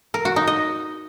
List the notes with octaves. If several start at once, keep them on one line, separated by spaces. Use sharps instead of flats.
A#4
F#4
D#4
D#5